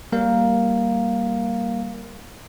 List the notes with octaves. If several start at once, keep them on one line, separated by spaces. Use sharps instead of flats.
G3 A#3 A#4 F5